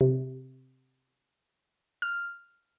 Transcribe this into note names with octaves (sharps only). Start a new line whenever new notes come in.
C3
F6